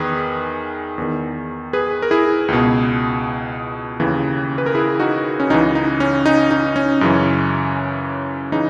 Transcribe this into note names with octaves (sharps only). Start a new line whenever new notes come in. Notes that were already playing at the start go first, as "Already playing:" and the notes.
Already playing: E2 D#3 G#4 B4
E2 D#3
G#4 B4
A#4
E4 G#4
C#2 B2
D#2 C#3 E3
B4
A#4
E4 G#4
D#4 F#4
C#4
C#2 C#3 E3 D#4
D#4
C#4
D#4
D#4
C#4
F#2 C#3 E3
C#3 E3 D#4